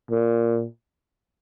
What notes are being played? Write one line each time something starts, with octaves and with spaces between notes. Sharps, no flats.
A#2